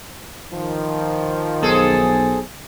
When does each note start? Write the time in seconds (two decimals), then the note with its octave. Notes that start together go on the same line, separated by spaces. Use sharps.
0.51 D#3 F3
1.62 B1 C4 G#4 A4